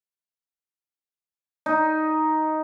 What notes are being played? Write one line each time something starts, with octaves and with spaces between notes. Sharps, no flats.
D#4